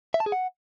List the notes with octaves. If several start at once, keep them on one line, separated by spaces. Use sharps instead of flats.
E5
A5
G#4
F#5